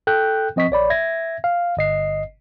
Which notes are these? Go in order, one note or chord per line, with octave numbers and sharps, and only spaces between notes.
A4 G5 F#6 G6
F3 C4 D#5 C#6 B6
A#1 C#5 D5 B5
E5 G#6 A#6
F5
G1 D#5 C7